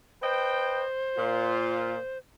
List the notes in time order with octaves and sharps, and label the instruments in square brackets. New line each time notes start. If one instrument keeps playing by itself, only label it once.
[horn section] B4 D#5 G5 [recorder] C5
[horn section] A#2 F4